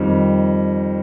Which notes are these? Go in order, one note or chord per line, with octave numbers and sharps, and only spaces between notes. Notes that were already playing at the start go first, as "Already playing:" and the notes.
Already playing: F2 D#3 G3